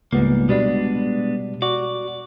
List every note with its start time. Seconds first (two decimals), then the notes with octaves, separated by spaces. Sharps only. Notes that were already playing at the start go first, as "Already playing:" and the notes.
0.12 C#2 G#2 G3 A#3 B3
0.49 B2 G3 G#3 B3 D4 D5
1.62 F#4 D5